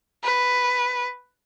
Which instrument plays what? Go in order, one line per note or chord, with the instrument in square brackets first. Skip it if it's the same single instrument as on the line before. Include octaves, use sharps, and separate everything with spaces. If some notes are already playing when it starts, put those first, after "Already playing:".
[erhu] B4